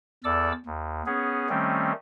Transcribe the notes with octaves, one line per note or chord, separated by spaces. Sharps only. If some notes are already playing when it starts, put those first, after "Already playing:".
E2 A4 D5 D6 E6
D#2
B3 C#4 G#4
D#3 G3 A3 C4 C#4